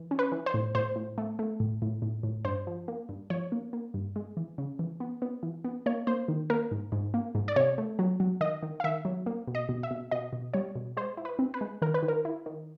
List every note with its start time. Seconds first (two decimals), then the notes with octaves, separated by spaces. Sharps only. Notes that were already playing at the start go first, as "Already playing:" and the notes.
Already playing: E3
0.11 C#4
0.19 B4
0.32 E3
0.46 C5
0.54 A2
0.75 A2 C5
0.96 A2
1.18 A3
1.39 A3
1.60 A2
1.82 A2
2.02 A2
2.23 A2
2.45 G2 C5
2.67 F3
2.88 A#3
3.09 G2
3.30 F3 C#5
3.52 A#3
3.73 A#3
3.94 G2
4.16 G#3
4.37 E3
4.58 C#3
4.79 E3
5.00 B3
5.22 B3
5.43 E3
5.65 B3
5.86 A#3 C#5
6.07 A#3 C5
6.28 D#3
6.50 A#3 A#4
6.71 G#2
6.92 G#2
7.14 A#3
7.35 G#2
7.48 D5
7.56 C3 C#5
7.78 A3
7.99 F#3
8.20 F#3
8.41 D#3 D#5
8.63 D#3
8.80 F5
8.84 D#3 E5
9.05 F#3
9.26 A#3
9.48 B2
9.55 D#5
9.69 B2
9.83 E5
9.91 B2
10.11 B2 D#5
10.33 B2
10.53 G3 C#5
10.75 B2
10.97 G#3 C5
11.17 E4
11.25 B4
11.39 C4
11.54 B4
11.61 G#3
11.82 D#3 A#4
11.94 B4
12.03 D#3
12.08 A#4
12.25 E4
12.46 D#3